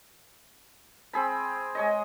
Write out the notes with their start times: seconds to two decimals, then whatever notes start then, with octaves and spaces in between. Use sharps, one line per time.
1.13 C4 G#4 B5
1.75 G#3 C#5 D#5